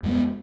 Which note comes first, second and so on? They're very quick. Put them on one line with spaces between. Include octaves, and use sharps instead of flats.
F2 G#3 B3